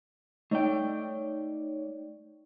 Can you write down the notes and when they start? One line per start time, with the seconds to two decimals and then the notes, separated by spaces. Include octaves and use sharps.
0.51 A3 D#4 C#5 D5 G5